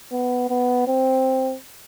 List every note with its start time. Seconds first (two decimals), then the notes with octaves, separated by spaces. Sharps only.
0.12 B3
0.50 B3
0.88 C4